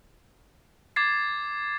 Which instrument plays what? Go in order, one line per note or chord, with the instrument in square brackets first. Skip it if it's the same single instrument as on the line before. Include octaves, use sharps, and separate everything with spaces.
[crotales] D6 G#6 A6 C7